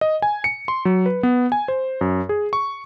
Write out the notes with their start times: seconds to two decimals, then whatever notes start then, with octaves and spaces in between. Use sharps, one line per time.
0.01 D#5
0.22 G#5
0.44 C#7
0.68 C6
0.85 F#3
1.06 B4
1.23 B3
1.52 G#5
1.68 C5
2.01 F#2
2.29 G#4
2.53 C#6